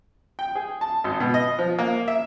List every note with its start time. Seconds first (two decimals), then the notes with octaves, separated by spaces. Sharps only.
0.39 G5
0.55 G#4
0.81 A5
1.04 G#1
1.20 B2
1.34 D#5
1.59 F3
1.79 A#3
2.08 E5